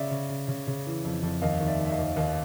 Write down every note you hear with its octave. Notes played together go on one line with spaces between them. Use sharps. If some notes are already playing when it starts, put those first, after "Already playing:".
Already playing: C#3 D5 E5
C#3
C#3
C#3
C#3
E3
F2
F2
D#2 D#5 F5
D#3
D5 E5
D#3
E5
D#5 F5
D#2
D#2 D#5 F5